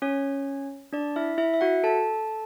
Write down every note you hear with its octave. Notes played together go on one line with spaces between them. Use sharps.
C#4 C#5
D4 D5
E4 E5
E4 E5
E5
F#4 F#5
A4 A5